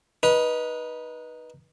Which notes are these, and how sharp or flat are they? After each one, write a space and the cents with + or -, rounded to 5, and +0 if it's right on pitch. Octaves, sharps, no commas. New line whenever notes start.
D#4 +0 B4 -20